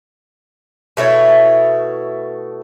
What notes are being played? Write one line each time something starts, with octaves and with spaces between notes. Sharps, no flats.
B2 A3 E4 C#5